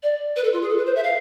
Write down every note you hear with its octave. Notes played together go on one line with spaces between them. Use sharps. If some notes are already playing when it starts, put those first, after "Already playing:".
D5
B4
A4
F4
G#4
A4
B4
C5
E5
F5